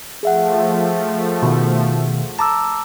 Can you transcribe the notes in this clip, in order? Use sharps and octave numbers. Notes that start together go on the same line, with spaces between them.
F3 A3 G#4 E5 F#5
B2 D#3
A5 A#5 D6 E6